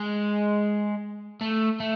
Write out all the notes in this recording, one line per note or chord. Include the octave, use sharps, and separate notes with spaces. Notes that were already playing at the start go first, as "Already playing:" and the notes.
Already playing: G#3
A3
A3